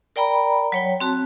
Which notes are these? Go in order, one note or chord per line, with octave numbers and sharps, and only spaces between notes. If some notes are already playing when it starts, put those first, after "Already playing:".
A#4 D5 G5 A#5 B5
F#3 C#5 G5
C4 F#4 A5